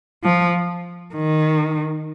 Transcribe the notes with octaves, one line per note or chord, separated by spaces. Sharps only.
F3
D#3